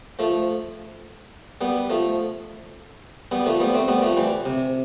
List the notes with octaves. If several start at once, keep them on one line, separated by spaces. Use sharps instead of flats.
F3 A3
G3 B3
F3 A3
G3 B3
F3 A3
G3 B3
A3 C4
G3 B3
F3 A3
E3 G3
C3